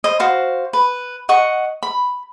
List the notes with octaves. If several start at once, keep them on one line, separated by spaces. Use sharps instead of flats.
C5 D#5
F#4 C5 F5
B4
D#5 F#5 C#6
B5